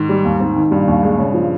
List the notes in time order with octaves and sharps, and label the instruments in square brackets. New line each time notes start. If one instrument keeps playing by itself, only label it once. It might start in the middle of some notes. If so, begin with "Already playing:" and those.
Already playing: [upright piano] G#2 [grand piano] D#3
[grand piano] G3
D#2
[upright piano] G#2 [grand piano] C4
[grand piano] D#3
[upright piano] G#2
[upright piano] G2 A#2 [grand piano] G3
[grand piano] D#2
G#3
C#3
F3